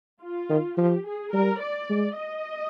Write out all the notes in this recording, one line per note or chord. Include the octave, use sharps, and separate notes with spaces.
F4
D#3
F3 G4
G#4
G3 A#4
D5
G#3
D#5